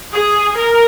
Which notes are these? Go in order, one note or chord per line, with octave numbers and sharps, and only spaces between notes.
G#4
A#4